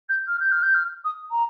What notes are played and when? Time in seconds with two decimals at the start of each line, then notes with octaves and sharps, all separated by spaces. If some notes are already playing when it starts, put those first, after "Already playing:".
0.09 G6
0.28 F6
0.40 G6
0.51 F6
0.62 G6
0.74 F6
1.04 D#6
1.31 A#5